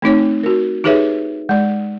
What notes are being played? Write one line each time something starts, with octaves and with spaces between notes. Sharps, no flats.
A3 C4 D#4 C#5
F#4 A#4
D#4 G4 G#4 B4 C#5 E5
G#3 D5